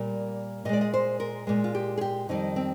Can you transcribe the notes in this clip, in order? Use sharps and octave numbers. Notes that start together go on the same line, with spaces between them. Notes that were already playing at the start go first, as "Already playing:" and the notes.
Already playing: A#2 G3 A#3 D5
A#2 G#3 D5 D#5
D#5
C5
A#4
A#2 G#3
F4
G4
G#4
G4
F2 D#3 G3 D#4
C4